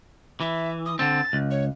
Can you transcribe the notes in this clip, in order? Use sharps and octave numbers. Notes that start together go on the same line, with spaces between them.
E3 E5
D#6
D3 C4 A6
C#2
C#5